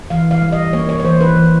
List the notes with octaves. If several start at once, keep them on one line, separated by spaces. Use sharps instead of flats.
E3 F5
F5
G3
D#5
A#3 C#5
C#5
C#5
E3 C5
B4
E3